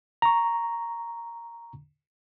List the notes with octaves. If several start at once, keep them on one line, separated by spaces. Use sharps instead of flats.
A#5 C#6